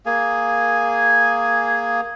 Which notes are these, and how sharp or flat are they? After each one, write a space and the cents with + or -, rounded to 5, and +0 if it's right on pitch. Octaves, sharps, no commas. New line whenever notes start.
A#3 +0 G#4 +0 G#5 +0